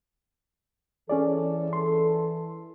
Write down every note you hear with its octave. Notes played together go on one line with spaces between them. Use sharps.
E3 C#4 G#4 A4 D5
C6